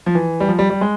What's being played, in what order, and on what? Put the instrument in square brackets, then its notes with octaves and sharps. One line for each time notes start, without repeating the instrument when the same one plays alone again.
[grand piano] F3
E3
G3
F3
G3
G3
G#3